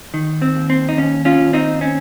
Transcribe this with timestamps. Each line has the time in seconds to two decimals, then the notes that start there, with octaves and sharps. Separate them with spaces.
0.14 D#3
0.42 C4
0.55 D#2
0.70 C4
0.89 D#4
0.97 D#2 C#4
1.25 C#4 F4
1.39 D#2
1.53 C4 D#4
1.81 C4 C#4